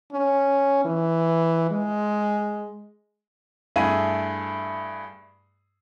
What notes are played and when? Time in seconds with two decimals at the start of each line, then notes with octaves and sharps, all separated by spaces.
0.13 C#4
0.85 E3
1.71 G#3
3.76 G2 A3 E4 G#4 D#7